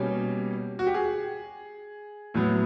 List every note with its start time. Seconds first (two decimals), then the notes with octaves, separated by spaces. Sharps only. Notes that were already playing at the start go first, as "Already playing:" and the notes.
Already playing: B2 G3 A#3 C#4
0.79 F#4
0.87 G4
0.94 G#4
2.34 A2 F#3 B3